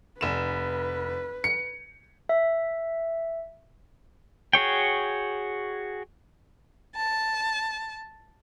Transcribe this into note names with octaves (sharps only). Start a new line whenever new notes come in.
F1 B4 E7
C#7
E5
F#4 G#4 C#5 G5
A5